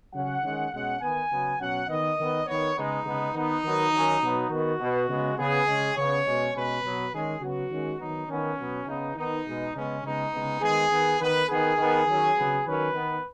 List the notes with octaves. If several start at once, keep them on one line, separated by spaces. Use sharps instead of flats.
C#3 F#3 C#4 F#5
D#3 G#3 C#4
B2 G#3 C#4 F#5
D#3 B3 G#5
C#3 F#3 B3
B2 F#3 C#4 F#5
D#3 B3 D#5
D#3 B3
D#3 B3 C#5
C#3 G#3 B3 D#4
C#3 G#3 B3
D#3 B3 D#4
D#3 F#3 B3
D#3 F#3 C#4
B2 F#3 B3
D#3 B3 F#4
B2 B3
C#3 G#3 B3
C#3 B3 G#4
C#3 G#3 C#4
C#3 B3 C#5
B2 G#3 C#4
B2 G#3 C#4 B4
B2 F#3 B3
D#3 G#3 C#4 G#4
C#3 F#3 B3 F#4
D#3 G#3 C#4
D#3 F#3 B3 D#4
D#3 B3 C#4
B2 F#3 B3
C#3 B3 D#4
D#3 B3 D#4
B2 G#3 B3
C#3 G#3 B3 C#4
C#3 G#3 B3 D#4
C#3 G#3 B3
D#3 G#3 B3 G#4
D#3 B3
D#3 B3 B4
D#3 B3 G#4
D#3 B3
D#3 F#3 C#4
C#3 F#3 B3
D#3 F#3 C#4 B4
D#3 B3